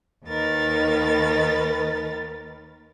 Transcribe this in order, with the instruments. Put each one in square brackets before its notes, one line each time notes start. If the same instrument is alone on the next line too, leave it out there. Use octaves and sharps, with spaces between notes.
[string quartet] D#2 D#3 A#4 B4 A6